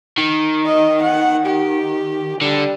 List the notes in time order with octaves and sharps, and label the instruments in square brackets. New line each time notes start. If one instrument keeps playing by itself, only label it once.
[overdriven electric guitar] D#3
[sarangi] D#5
F#5
G4
[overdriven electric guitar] D3 [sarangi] G3